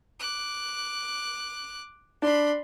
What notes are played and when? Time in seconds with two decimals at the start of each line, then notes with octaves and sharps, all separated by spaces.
0.19 D6 F#6
2.22 D4 B5 C6